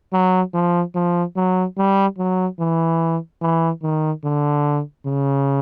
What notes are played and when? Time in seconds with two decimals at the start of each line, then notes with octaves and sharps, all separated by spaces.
0.13 F#3
0.54 F3
0.95 F3
1.36 F#3
1.78 G3
2.18 F#3
2.60 E3
3.42 E3
3.83 D#3
4.24 D3
5.07 C#3